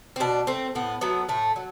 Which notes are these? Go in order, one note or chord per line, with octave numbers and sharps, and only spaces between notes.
C4
B2 D4
A3 C4
A2 B3
F#3 A3 B3
A2 A3
F#3